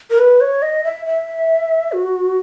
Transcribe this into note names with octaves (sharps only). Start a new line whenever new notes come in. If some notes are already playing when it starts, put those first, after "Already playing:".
A#4
B4
C#5
D#5
E5
E5
F#4